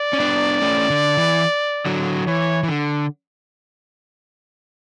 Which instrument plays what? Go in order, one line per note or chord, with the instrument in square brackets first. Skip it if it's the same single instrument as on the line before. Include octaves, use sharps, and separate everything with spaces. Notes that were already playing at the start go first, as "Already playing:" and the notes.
Already playing: [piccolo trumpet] D5
[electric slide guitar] C#4
B3 D4
A3 C#4
D3
E3
D3 F#3
[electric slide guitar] E3 [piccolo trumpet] C#5
[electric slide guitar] E3
D3